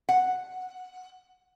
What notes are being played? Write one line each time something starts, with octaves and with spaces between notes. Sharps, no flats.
F#5